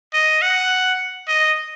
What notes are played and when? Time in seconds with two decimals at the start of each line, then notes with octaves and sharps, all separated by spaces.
0.13 D#5
0.42 F#5
1.28 D#5